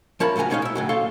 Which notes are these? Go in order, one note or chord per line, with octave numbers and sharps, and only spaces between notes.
F3 A#4 C#5 E5 A5 B5
A2 C#3 F#3 G#5 A#5
G3 G#3 C#4 D#4 C#5 F5
E4 E5
A2 C#3 F#3
D#2 A4 C#5 F5 C6